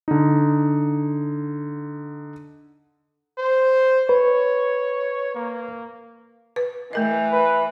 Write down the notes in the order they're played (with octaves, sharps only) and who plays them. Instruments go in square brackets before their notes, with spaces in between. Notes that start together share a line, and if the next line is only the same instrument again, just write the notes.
[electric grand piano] D3 D#4
[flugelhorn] C5
[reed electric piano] B4 [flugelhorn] C#5
[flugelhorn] A#3
[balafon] B4
[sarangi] E3 [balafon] A3 A#4 D#5
[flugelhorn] B4